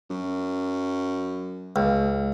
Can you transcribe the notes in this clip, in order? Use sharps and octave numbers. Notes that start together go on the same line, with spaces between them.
F#2
C#2